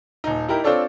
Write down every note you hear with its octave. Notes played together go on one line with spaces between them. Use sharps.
D#1 D#4
D#4 E4 G4 A#4
C4 D4 F4 A4 C#5 D5